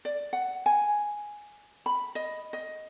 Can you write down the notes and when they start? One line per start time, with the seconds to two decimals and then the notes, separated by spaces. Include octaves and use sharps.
0.05 D5
0.33 F#5
0.66 G#5
1.86 B5
2.15 D#5
2.53 D#5